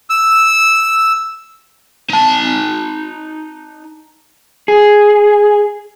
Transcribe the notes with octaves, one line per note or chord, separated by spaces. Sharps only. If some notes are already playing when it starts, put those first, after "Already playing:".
E6
D#4 A5
G#4